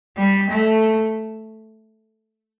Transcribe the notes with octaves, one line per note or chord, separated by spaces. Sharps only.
G3
A3